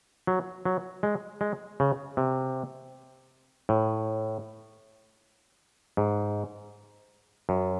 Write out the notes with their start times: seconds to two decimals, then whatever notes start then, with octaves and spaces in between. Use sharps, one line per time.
0.27 F#3
0.65 F#3
1.03 G#3
1.41 G#3
1.80 C#3
2.17 C3
3.69 A2
5.97 G#2
7.49 F#2